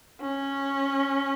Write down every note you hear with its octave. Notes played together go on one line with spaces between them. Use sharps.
C#4